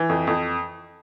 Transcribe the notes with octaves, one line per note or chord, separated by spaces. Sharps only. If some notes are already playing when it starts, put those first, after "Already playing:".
Already playing: E3
F2
F2